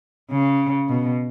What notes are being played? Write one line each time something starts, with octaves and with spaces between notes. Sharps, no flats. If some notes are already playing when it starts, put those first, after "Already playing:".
C#3
B2